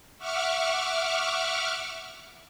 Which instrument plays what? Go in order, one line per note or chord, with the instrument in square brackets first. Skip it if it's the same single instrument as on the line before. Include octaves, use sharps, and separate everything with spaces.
[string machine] E5 F#5 C#6 D6 F6